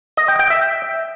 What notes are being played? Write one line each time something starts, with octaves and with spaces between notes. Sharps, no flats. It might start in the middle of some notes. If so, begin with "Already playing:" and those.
D#5
G5
G5
E5